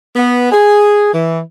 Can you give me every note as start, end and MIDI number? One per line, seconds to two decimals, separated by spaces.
0.16 0.50 59
0.52 1.10 68
1.13 1.40 52